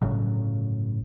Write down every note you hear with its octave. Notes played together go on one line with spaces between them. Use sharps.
G1 A2 C#3 F#3